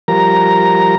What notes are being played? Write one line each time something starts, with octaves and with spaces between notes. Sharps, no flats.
F3 G3 A#4 A#5